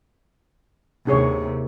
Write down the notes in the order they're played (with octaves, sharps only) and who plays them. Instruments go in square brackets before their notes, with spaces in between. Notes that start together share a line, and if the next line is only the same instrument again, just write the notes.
[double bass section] D#2 C3 [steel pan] D4 G#4 C#5